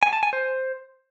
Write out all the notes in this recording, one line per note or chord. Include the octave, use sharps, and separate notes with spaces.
G#5
A5
G#5
C5